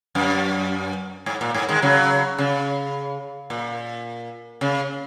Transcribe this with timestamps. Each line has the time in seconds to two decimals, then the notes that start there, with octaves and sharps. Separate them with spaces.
0.15 F#2
1.26 G#2
1.41 A#2
1.54 G#2
1.69 D#3 G#3
1.82 C#3 F#3
2.38 C#3
3.50 A#2
4.61 C#3